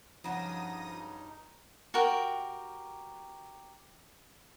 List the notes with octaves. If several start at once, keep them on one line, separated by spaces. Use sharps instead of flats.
G2 C#3 F3 F#3 D4 D#4 D#6 A#6
F#4 G4 A#4 G5